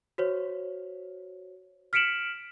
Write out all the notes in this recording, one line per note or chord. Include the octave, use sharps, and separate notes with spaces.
F#4 C5 C#5
F6 B6 C#7 D7 E7 F#7